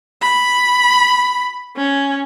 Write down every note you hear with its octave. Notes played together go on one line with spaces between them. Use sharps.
B5
C#4